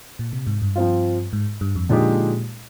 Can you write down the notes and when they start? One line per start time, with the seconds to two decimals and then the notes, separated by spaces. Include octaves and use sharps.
0.19 A#2
0.33 C3
0.47 G#2
0.62 G2
0.76 F3 C4 F4
1.33 G#2
1.61 G2
1.76 F2
1.89 A#2 D3 F3 G#3 D#4 G4